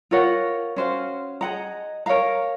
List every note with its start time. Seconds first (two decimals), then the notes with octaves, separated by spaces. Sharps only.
0.11 F4 A#4 C#5 F#5
0.76 C#4 F#4 C5 F5
1.41 G#4 D#5 F#5 A#5
2.06 A#4 C#5 F5 A#5